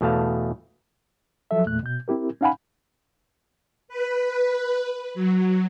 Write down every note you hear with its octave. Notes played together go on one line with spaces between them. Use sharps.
E2 B2 A3 F5 A5
F3 F#3 A4 E5
E2 A#2 A3 F#6
B2 G6
C4 E4 G4 A#4
C#4 D#4 F5 F#5 G#5 B5
B4
F#3